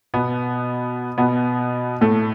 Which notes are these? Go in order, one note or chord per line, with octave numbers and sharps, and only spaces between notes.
B2 B3
B2 B3
A2 A3